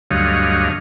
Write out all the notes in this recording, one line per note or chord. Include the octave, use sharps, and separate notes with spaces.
D2 G2 F#3 C#5 D#5 F5